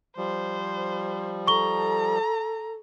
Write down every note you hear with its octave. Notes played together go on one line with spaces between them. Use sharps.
F3 G3 C5
A4 A#5 C#6 G7